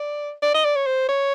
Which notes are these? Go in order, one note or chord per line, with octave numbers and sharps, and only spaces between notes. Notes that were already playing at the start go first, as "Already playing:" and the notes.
Already playing: D5
D5
D#5
D5
C#5
C5
C#5